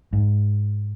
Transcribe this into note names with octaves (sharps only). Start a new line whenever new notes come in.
G#2